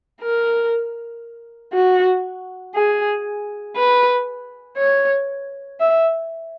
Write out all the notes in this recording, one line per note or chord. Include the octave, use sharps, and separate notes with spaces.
A#4
F#4
G#4
B4
C#5
E5